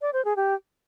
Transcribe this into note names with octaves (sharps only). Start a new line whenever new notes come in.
D5
C5
G#4
G4